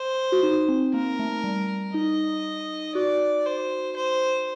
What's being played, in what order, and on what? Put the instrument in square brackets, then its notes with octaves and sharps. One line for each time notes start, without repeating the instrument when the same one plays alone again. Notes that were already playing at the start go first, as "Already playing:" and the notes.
Already playing: [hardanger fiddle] C5
[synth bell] F#4
D#4
C4
[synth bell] A#3 [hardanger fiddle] A#4
[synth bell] A3
G3
[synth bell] D#4 [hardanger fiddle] D#5
[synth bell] F#4 [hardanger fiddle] D5
[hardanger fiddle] C5
C5